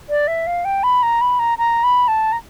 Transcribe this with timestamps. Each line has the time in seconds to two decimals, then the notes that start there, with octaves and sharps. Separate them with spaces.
0.09 D5
0.27 E5
0.47 F5
0.65 G5
0.83 B5
1.03 A#5
1.21 B5
1.39 A#5
1.58 A#5
1.84 B5
2.08 A5
2.32 A#5